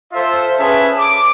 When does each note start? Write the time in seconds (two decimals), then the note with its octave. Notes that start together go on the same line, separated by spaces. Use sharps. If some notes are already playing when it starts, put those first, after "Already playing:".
0.13 F4 A4 C5 E5
0.59 C#4 G#4 B4 E5 A5
0.98 D6